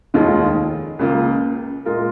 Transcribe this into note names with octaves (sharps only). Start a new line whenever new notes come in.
F1 D#2 D#3 G#3 F4
C#2 C#3 A#3 F4
A#2 G#3 F4 A#4